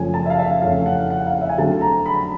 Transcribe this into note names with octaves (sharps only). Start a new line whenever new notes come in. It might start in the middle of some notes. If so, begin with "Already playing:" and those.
Already playing: F#2 C#3 F3 A3 C#4 G#5
A5
E5
F5
E5
F5
F2 C#3 E3 A3 C#4 F5
F#5
F#5
F5
E5
G#5
D3 F#3 A3 C4 A5
A#5
B5